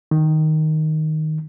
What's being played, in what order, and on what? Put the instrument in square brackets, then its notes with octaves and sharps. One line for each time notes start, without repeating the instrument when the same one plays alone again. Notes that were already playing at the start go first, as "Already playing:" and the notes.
[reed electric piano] D#3